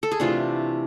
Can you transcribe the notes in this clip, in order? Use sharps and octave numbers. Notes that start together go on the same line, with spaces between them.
A4
G#4
C3 E3 A3 D4 F4